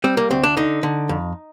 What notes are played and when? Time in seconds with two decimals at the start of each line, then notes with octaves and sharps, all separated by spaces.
0.04 G3 C4
0.17 A#3
0.30 D2 C4
0.43 D4
0.57 D3 D#4
0.83 D3
1.09 F2